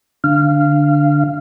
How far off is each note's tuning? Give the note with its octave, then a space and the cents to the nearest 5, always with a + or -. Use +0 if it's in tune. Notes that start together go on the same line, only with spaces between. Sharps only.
D3 +0 F5 -20